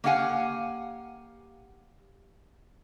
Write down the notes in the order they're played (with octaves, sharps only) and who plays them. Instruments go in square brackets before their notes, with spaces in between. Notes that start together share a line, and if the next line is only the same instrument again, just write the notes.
[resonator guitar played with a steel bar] A#3 D4 G4 F5 F#5 G#5